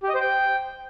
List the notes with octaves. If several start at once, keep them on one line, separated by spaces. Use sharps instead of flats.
G4
D#5
C5
G5